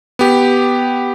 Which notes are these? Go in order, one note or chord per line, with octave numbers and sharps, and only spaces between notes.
B3 G4